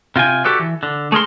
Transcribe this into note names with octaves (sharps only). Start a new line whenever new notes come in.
C3 F4 G5 G#5
F#4 G4 A4 B4 D5
E3
D3
A3 G#4 A#4 C6